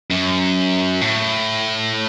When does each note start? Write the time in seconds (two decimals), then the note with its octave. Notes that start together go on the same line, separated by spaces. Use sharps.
0.11 F#2
1.01 A2